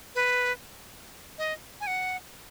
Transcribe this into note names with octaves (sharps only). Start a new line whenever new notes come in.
B4
D#5
G#5
F#5